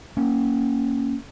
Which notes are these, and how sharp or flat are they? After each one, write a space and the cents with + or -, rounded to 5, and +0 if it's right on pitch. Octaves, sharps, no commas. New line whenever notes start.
A#3 +0 C#4 +0